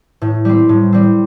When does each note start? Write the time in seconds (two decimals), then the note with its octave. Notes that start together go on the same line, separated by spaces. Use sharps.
0.22 A2
0.45 G3 C4
0.69 A2
0.92 G3 C4